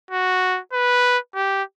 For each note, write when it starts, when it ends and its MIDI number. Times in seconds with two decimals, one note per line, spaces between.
0.11 0.59 66
0.73 1.18 71
1.35 1.63 67